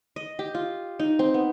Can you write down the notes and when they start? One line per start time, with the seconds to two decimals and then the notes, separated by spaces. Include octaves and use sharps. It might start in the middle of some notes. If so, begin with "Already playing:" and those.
0.16 D#5
0.39 G4
0.55 F4
1.00 D#4
1.19 C4
1.34 B3